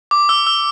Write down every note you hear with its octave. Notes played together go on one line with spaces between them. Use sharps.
D6
E6
E6